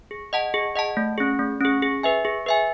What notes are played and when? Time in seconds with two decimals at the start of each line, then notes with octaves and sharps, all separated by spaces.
0.11 G#4
0.33 D#5 F#5 A5
0.54 G#4
0.76 D#5 F#5 A5
0.97 A3
1.18 C#4 G#4
1.39 A3
1.61 C#4 G#4
1.82 G#4
2.03 B4 E5 G#5
2.25 G#4
2.46 B4 E5 G#5